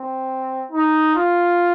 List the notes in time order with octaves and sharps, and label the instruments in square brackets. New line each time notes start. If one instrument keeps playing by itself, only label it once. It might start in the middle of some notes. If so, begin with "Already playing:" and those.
Already playing: [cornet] C4
D#4
F4